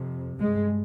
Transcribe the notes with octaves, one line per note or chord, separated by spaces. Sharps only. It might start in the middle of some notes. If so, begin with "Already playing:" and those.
Already playing: F2 C3
G2 G#3